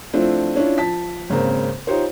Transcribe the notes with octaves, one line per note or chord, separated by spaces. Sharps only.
F3 A3 C4 D4 E4 F4
C#4 D4 E4 F4
F3 A5 B6
G#1 C#3 A#3 C4
D#4 F4 G4 C5 C#5